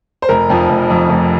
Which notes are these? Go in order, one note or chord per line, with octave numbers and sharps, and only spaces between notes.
C5
F1 A#4
F2 F3
F1
F2 F3
F1